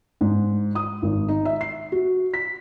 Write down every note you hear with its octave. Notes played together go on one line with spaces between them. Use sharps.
G#2
D#6
G#1
D#4
E5
C7
F#4
B6